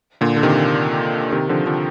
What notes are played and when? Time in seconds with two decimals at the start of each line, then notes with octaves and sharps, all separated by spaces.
0.21 A#2 D3
0.36 D3
0.43 C3 D#3
1.32 C3 D#3
1.49 D3 F3
1.66 D3 F3